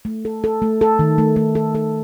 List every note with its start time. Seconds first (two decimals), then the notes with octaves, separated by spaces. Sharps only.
0.05 A3
0.25 A4
0.44 A4
0.62 A3
0.81 A4
0.99 D#3
1.18 A3
1.36 A3
1.55 A4
1.75 A4